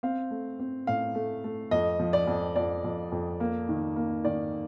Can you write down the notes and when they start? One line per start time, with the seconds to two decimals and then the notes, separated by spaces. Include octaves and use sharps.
0.03 C4 F5
0.31 A3
0.60 C4
0.87 A2 F5
1.15 A3
1.44 A3
1.71 F2 D#5
1.99 F3
2.13 D5
2.27 F2
2.56 F2 D5
2.84 F2
3.12 F2
3.40 A#3
3.69 D#3
3.96 A#3
4.24 D#3 D5